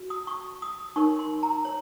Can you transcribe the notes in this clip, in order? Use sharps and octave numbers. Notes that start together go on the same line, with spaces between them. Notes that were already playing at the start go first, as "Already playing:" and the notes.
Already playing: F#4
D#6
C#6
D#6
D#4 A#4 C#5 C#6
C6
A#5
C#5